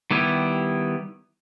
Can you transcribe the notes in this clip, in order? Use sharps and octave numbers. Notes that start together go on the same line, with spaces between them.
D#3 G3 B3 E4 G4